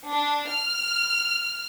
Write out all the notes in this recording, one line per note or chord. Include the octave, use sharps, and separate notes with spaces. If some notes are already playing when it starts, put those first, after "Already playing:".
D4
F6